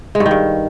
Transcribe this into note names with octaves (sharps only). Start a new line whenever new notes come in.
G#3
G2
D#3
G2